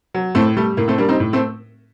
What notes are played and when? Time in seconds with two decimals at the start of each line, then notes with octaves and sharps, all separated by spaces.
0.14 F#3
0.35 A2 A3 C4
0.57 G3 A3
0.77 A2 A#3
0.88 A3 C4
0.98 G3 A#3 D4
1.09 C4 D#4
1.20 A2
1.33 A3 C4